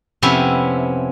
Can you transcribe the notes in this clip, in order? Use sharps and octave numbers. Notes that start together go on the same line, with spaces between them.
F2 C3 B3 C#4 E4 E5